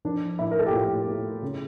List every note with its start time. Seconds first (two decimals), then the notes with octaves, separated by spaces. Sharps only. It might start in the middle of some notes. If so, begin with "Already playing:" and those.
0.05 F3 D4
0.39 A2 E4
0.51 A#4
0.59 A4
0.66 G4
0.73 A2 F4
1.07 A3
1.42 C#3